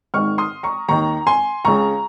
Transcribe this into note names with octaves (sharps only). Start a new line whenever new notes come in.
G#1 G#2 D#3 C#6 F6
C6 D#6
A#5 C#6
D#2 D#3 A#5 C#6
G#5 C6
C#2 C#3 A#5 C#6